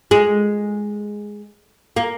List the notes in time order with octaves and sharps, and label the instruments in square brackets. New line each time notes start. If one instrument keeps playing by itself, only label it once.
[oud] G#3
A#3